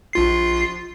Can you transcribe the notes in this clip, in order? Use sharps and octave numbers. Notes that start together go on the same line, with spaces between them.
A#1 F4 C7